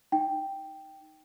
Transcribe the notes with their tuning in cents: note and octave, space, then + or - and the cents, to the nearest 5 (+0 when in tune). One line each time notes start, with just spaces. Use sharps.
D#4 +0 G5 +0